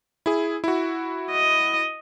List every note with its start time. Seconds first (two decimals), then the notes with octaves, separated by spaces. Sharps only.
0.26 E4 G#4
0.64 E4 F#4
1.31 D#5